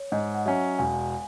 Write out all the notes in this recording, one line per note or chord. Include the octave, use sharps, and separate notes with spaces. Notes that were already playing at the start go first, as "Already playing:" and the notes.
Already playing: C#5
G#2 D#5
F#5
F#3 C#4 E5
E1 G#5